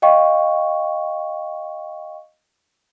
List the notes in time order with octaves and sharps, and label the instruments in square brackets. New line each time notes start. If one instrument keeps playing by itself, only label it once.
[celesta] D#5 F5 G5 C#6